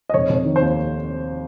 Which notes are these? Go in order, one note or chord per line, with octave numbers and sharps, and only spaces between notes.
D#5
F1 C#5
F1 C#5
D#3
C5
D#2